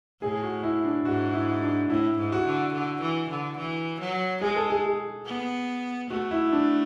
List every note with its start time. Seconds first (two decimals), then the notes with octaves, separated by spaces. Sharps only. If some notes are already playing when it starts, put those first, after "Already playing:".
0.22 A2 G#4
0.43 F#4
0.63 E4
0.85 D4
1.05 G#2 F#4
1.33 E4
1.62 D4
1.90 A2 E4
2.18 G#2
2.32 F#4
2.46 D3
2.73 D3
3.01 E3
3.29 D3
3.58 E3
4.01 F#3
4.41 G#3 G#4
4.56 A4
4.70 G#4
4.84 G#4
5.26 B3
6.10 A3 F#4
6.31 E4
6.52 D4